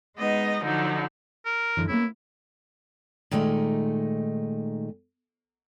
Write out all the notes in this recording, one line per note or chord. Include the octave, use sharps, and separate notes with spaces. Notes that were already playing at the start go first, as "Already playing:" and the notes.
G#3 B3 D#4 D#5
D3 F3 F#3 D#4
A#4
G2 D3 E3
A#3 B3 C#4 E4
A#2 D#3 G#3 A3 D#4